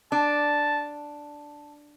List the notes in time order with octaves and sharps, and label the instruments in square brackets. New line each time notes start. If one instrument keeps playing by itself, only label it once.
[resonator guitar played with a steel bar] D4 [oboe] A5